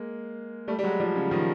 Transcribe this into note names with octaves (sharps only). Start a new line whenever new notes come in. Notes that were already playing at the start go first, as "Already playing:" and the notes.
Already playing: G#3 A#3
G3 A3
G3
F#3 G#3
F3 G3
C#3
D#3 F3